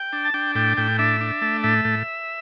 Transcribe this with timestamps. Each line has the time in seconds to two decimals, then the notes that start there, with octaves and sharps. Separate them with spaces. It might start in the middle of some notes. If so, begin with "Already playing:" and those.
Already playing: G5
0.13 D4
0.25 A5
0.34 D4 G5
0.55 A2 G5
0.77 A2 G5
0.99 D4 E5
1.21 D4
1.42 A3
1.63 A2 E5
1.85 A2